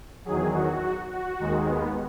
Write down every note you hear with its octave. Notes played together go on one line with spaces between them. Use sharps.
E2 D#3 F#3 G#4
F#4
F#4
D#2 D#3 G#3
B3